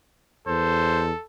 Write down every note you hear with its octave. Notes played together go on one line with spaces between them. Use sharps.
E2 A4 C5